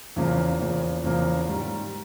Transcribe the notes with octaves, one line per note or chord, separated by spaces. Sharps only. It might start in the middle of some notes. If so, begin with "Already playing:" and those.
E2 C#3 F3 A#3
E2 C#3 F3 A#3
E2 C#3 F3 A#3
G#2 D#3 G3